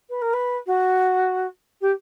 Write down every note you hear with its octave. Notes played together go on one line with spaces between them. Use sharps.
B4
A#4
B4
F#4
G4